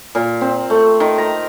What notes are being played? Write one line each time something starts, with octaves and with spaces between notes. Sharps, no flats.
A#2
C4
A3
D#3
A#5